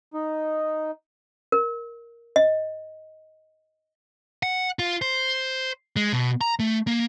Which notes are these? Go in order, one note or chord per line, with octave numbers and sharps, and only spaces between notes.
D#4
A#4
D#5
F#5
F4
C5
G#3
B2
A#5
A3
A#3